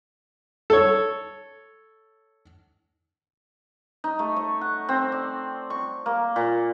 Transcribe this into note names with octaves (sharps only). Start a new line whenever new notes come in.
A4 C#5
D#4
A3
C#5
F#5
C4
D5
C#6
A#3
A#2